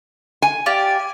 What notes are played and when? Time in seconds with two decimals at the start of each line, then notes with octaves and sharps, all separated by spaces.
0.42 G#5
0.66 F4 G4 D5